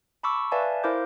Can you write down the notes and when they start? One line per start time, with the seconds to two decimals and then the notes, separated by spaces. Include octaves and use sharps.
0.23 A5 B5 C#6 D6 E6
0.52 B4 D5 E5 F5 G#5 A5
0.84 E4 A#4 C5 F5 D6 G6